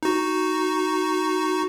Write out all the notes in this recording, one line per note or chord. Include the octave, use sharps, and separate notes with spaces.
D#4 F#4